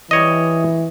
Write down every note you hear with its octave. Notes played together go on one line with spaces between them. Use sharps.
E3 G3 C#5 D#5